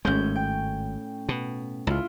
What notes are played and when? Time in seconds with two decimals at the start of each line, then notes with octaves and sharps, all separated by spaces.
0.05 G#1 A2 G#3 C#4 G6
0.35 G5
1.29 B2
1.87 C#2 E4 F4